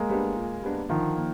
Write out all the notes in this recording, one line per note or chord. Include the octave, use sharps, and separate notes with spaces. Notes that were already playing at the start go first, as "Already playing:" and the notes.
Already playing: G#3 A#3
G3 B3 D4
A#2
G3 B3 D4
D3 D#3 F3
A#3